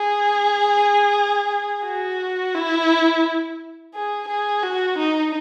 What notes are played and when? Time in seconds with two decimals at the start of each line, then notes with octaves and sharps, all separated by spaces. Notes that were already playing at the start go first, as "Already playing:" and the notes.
Already playing: G#4
1.85 F#4
2.55 E4
3.94 G#4
4.28 G#4
4.64 F#4
4.98 D#4